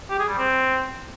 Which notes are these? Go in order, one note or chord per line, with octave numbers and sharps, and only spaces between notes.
G4
G#4
G3
C4